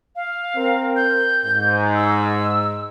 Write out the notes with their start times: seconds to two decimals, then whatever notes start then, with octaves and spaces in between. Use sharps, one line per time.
0.16 F5
0.56 C4 A#4
0.96 G6
1.45 G#2
1.95 E6